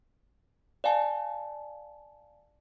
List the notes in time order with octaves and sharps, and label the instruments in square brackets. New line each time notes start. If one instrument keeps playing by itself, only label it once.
[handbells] D5 F5 G#5 A5